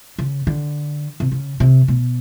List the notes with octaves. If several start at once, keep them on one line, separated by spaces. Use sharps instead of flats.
C#3
D3
C3
C#3
C3
B2